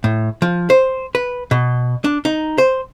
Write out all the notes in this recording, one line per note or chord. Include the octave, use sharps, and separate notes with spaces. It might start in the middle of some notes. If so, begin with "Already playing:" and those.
A2
F3
C5
B4
B2
D4
D#4
C5